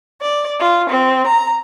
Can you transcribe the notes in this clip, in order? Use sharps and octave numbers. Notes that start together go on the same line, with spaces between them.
D5
F4
C4
A#5